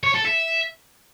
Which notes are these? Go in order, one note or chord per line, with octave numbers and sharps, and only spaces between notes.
C#5
A4
E5